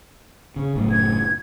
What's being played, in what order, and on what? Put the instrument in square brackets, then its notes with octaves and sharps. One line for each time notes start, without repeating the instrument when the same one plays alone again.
[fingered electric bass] C#3
F#1 F#2 A2
[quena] G#6